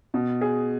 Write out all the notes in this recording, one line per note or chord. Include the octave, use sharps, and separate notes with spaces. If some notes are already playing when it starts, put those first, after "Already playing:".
B2
G#4